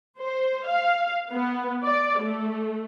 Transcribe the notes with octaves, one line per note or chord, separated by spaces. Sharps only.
C5
F5
B3
D5
A3